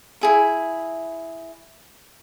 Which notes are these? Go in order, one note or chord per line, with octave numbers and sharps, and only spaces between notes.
E4 G#4 E5